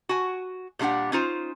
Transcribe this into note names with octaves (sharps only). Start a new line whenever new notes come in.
F#4 G#5
A#2 G3 D4 G4 F#5
C#4 D#4 F4 C5